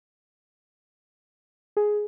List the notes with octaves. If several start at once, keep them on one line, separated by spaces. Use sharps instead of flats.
G#4